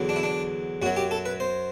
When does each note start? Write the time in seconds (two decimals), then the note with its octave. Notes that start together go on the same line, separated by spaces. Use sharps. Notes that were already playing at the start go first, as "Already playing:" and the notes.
Already playing: E2 D3 F#3
0.09 D4
0.16 E4
0.23 D4
0.82 F#2 F#4
0.86 F#3
0.97 G4
1.11 A4
1.26 B4
1.40 C5